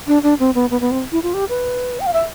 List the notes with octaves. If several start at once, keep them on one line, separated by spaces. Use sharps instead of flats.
D4
D4
C4
B3
B3
B3
C4
E4
F4
G4
B4
G5
F5
E5